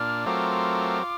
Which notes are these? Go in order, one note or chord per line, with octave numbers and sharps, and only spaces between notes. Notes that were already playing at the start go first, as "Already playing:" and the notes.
Already playing: A#2 D4 F6
F#3 A3 C4 F4 A#4 D6
F4